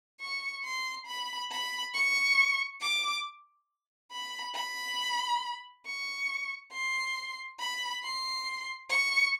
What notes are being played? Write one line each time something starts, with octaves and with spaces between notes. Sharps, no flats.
C#6
C6
B5
B5
C#6
D6
B5
B5
C#6
C6
B5
C6
C#6